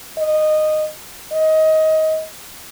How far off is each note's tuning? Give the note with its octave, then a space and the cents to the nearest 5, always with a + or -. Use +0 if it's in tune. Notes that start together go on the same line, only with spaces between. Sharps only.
D#5 -15
D#5 +20